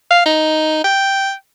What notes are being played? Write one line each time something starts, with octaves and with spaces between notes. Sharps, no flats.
F5
D#4
G5